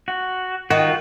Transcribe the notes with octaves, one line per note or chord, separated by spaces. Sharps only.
F#4
D#3 F4 F#4